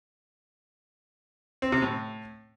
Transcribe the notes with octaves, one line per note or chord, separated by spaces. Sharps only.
C4
C3
A2